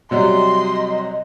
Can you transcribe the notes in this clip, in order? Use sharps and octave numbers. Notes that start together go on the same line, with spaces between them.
C3 F#3 G3 D#5 C6